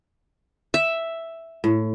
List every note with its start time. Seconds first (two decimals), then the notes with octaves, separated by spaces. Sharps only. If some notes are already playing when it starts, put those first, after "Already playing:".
0.74 E5
1.64 A2